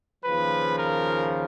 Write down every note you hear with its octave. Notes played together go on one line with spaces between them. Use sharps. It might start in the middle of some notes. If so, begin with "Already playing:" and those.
D#2 C#3 F3 B4
A#4